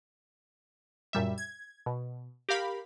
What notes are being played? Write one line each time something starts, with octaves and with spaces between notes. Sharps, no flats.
F#2 A#2 G3 E5
G#6
B2
G4 A#4 F5 B5